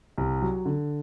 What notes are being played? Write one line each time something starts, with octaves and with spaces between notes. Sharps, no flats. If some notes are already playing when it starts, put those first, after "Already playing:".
C2
F#3
D3